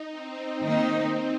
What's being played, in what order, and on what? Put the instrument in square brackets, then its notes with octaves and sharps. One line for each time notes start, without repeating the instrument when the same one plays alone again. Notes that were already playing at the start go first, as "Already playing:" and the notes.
Already playing: [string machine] D#4
C4
[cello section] D#3 A#3 D#4